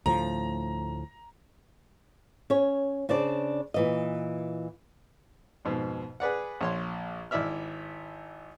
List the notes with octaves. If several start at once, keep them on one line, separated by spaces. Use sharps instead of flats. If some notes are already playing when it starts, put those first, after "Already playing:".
D2 A2 F3 A#5
C#4 C#5
C#3 D4 C5 D5
A#2 E3 D#5
F2 G#2 B2
G#4 B4 D5 F#5
A#1 C#5 C6
G#1 E4 D5 E5 F6